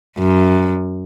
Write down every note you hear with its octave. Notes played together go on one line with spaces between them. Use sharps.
F#2